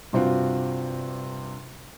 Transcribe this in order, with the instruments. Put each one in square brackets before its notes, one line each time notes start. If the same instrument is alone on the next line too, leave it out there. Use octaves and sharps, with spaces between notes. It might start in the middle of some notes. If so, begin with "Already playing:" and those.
[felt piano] G2 C3 C4 F4 F#4